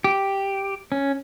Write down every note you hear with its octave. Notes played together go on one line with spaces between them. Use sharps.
G4
C#4